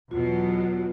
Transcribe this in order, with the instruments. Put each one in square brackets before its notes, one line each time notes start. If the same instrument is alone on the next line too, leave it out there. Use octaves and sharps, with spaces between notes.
[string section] E2 B2 F#3 [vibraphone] F4